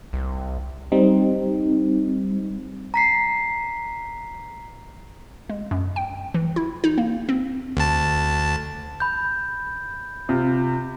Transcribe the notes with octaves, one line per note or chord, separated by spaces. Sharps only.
C2
G3 C4 D#4
A#5 B6 C7
G#3
F#2
G5
E3
E4
D#4
A#3
C4
D2 A5
B5 G6
C3 F4